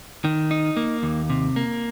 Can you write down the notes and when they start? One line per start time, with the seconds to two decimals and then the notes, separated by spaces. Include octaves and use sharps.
0.25 D#3
0.51 D#4
0.77 A#3
1.03 D#2
1.30 C3
1.56 A#3